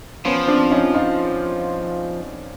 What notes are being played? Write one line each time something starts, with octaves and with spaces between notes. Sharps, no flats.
F3 B3 C#4
C4 D4
C#4 D#4
D#4 F4